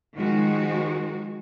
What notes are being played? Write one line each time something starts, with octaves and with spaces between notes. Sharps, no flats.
D#3 F3 G#3 F#4